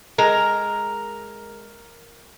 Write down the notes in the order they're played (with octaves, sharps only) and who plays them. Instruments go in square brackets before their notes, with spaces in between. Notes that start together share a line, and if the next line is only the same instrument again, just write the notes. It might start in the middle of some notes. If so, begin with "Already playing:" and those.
[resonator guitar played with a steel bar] G#3 [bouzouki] A#4